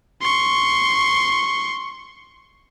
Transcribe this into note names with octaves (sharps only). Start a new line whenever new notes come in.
C6 C#6